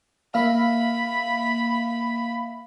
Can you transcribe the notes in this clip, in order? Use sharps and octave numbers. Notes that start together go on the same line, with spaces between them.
A#3 E5 F5 B5